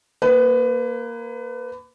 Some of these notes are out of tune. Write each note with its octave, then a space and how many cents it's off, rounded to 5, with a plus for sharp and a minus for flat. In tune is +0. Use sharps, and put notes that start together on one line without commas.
A#3 +0 B4 +25